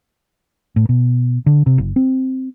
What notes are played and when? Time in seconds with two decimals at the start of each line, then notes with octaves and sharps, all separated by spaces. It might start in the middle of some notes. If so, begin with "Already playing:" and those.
0.76 A2
0.89 B2
1.46 D3
1.66 C3
1.78 F#1
1.96 C4